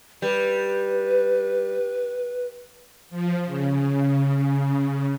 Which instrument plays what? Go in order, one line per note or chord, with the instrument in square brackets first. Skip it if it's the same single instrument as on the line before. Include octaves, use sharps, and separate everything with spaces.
[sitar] G3 [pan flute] B4
[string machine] F3
C#3